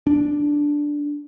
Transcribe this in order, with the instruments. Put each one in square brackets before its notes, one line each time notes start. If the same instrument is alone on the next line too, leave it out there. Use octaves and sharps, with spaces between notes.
[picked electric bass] D4